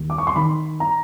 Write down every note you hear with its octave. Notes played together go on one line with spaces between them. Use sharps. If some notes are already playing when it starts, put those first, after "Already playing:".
Already playing: D#2
D6
C#6
C6
D#3 B5
A#5